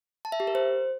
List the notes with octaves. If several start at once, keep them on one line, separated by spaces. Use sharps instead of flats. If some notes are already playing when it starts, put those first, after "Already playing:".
A5
E5
G4
A#4
C5